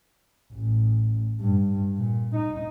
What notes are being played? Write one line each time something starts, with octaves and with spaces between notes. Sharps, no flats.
A1
G2
A#2
D#4